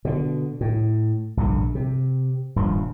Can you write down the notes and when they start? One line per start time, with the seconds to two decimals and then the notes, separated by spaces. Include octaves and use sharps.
0.05 B2 D3
0.61 A2
1.37 A#1 G2 D3
1.75 C3
2.56 D#1 G2 F3